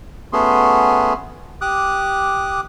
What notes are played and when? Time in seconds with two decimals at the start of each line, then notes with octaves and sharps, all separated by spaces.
0.33 A3 B3 C#4 F#4 G#4 C6
1.61 G4 D6 D#6 F#6